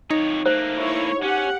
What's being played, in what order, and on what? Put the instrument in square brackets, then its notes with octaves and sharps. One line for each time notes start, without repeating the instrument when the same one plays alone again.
[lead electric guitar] F2 C#5 [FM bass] D#4
[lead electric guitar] A3 A#3 [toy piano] C5
[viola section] E4 C#5
[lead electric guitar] C#4 [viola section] G4 F#5